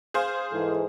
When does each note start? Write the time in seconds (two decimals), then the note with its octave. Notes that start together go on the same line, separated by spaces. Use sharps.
0.14 G#4 C5 F5
0.52 G#2 E3 A4